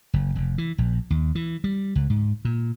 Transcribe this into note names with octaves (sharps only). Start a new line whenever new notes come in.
F#1
F1
E3
A#1
D#2
E3
G3
C#2
G#2
A#2